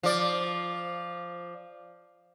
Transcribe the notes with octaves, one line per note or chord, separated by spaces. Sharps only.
F3 D5